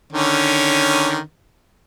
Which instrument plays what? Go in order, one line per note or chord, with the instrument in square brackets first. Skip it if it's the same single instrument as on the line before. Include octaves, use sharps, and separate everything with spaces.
[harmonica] D3 D#3 C#4